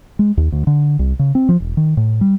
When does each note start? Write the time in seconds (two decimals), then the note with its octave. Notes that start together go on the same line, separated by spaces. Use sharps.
0.19 G#3
0.37 D#2
0.52 D2
0.67 D3
0.99 C2
1.19 C#3
1.35 C4
1.49 F3
1.60 E1
1.77 D#3
1.97 A2
2.21 G3